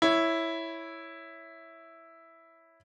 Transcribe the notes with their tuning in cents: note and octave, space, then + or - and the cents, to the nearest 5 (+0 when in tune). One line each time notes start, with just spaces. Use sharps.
E4 +0 C#5 +0